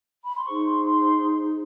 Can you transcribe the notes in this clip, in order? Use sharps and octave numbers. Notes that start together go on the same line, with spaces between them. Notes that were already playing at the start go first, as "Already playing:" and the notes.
B5
C6
D#4 G#4 C5 C#6
C6
C6